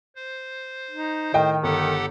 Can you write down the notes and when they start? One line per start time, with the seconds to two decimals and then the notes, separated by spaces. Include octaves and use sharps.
0.16 C5
0.91 D#4
1.34 A2 D#3 D#5 G5
1.63 G1 G4 A4 F#5